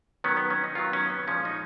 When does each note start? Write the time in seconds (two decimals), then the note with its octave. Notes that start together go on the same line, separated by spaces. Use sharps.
0.24 D#3 F#3 B3 C#4
0.37 B3
0.50 C#4
0.64 D#4
0.75 D#3 F#3 B3 F4
0.93 C#4
1.10 B3
1.27 A#2 F3 G#3 C#4
1.45 D#4